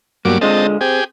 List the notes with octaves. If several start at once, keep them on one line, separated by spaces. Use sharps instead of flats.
G2 B2 F#3 A#3 D6
D3 G#3 C4 F4 D#5 A5
C4 G4 G#4